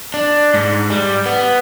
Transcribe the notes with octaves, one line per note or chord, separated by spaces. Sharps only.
D4
G#2
G3
B3